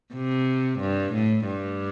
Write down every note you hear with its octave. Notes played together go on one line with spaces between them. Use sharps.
C3
G2
A2
G2